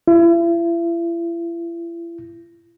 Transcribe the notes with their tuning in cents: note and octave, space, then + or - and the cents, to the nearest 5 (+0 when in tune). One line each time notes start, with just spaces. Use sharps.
E4 +40